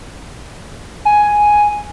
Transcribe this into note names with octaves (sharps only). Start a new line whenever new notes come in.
G#5